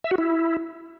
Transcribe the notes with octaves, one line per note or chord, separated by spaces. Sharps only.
E5
F#4
E4